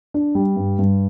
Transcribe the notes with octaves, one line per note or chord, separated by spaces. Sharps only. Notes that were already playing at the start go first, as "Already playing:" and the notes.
D4
G3
G2
G2